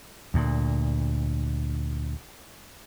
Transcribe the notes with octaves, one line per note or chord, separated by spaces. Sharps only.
D2 A#2